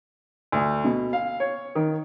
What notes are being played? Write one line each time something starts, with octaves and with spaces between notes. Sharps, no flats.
D2
B2
F5
C#5
D#3